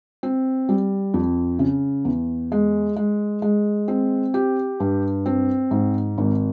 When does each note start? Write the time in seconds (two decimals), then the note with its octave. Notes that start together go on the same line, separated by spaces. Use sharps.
0.23 C4
0.69 G3
1.14 F2
1.59 C#3
2.05 E2
2.52 G#3
2.96 G#3
3.42 G#3
3.88 C4
4.34 G4
4.80 G2
5.26 C4
5.71 G#2
6.18 G#1